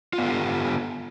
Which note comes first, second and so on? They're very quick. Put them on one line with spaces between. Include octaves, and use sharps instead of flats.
F4 B3 A4 G4